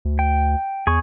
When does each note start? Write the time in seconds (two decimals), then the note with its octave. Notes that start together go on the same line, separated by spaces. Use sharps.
0.05 D2
0.19 G5
0.87 E2 G#4 C#6